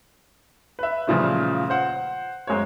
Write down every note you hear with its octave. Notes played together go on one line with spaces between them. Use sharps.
B4 E5
A#2 C#3 E3 F3 G3 A3
C5 F#5
F#2 G#3 A#3 C5 C#5